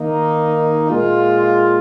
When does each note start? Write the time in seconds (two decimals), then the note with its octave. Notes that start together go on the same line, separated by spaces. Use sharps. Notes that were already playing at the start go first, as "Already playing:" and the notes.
Already playing: D#3 A#3 D#4
0.89 A#2 G#3 F4